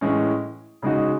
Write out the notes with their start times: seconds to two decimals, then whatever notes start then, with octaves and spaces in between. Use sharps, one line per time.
0.01 A2 E3 G#3 C#4
0.82 C#3 G#3 D#4 F#4